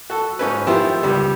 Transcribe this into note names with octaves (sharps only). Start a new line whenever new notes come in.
F#4 A4
G#2 C#4 B4
D#3 F3 B3 E4 G4 C5
C#2 G3